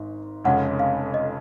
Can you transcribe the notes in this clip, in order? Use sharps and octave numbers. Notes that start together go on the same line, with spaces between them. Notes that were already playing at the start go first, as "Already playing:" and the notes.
Already playing: G#1 G#2
F1 F2 C#3 G#3 C#4 F#5
F5
D#5